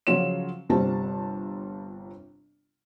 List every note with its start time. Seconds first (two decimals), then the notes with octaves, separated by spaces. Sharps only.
0.07 C#3 F3 F#3 F4 C#5 E7
0.69 G1 C3 G3 C4 F4 A5